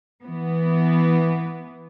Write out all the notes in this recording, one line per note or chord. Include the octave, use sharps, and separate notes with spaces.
E3 B3